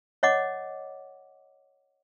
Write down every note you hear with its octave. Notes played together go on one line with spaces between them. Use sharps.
C#5 D#5 F#5 D6